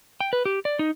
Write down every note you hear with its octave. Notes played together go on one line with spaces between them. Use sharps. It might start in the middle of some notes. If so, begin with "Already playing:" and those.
G5
B4
G4
D5
D#4